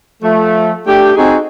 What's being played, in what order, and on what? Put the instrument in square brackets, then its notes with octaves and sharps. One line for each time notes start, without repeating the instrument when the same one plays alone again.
[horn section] F3 A3
A3 D4 G4
C4 D#4 F#4 G#4